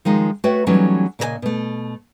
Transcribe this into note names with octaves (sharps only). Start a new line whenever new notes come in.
D#3 F3 G#3 D#4
A3 F#4 B4 C#5 E5 G5
E3 F#3 G3 A3 C#4 D#4
A#2 C#3 E4 A#4 D#5 G#5
B2 A3